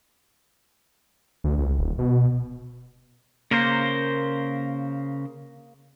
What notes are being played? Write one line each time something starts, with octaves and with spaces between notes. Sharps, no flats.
D2
C#2
D#1
B2
C#3 A#3 A#4 C5